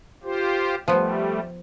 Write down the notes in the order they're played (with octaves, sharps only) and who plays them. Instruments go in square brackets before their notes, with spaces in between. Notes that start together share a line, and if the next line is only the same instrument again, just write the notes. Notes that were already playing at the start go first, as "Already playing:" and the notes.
[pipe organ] F4 G4 C5
[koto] F3 B3 [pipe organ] G3 A3